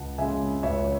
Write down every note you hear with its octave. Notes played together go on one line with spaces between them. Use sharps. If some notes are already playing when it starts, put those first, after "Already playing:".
Already playing: C#2 F#5 A5
C#3 G#3 E5 G#5
C#2 C#5 E5